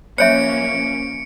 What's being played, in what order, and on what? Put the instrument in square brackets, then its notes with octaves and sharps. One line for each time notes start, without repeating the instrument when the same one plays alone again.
[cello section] F3 A#3 C#4 [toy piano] C5 C#5 E5 [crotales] C#7 D7